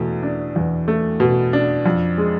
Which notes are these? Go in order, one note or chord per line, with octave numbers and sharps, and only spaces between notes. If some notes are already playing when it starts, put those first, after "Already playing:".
Already playing: E2 B2 A3
D4
E2
A3
B2
D4
F2
G#3